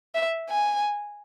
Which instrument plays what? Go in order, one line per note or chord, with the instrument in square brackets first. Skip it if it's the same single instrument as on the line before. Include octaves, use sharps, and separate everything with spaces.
[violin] E5
G#5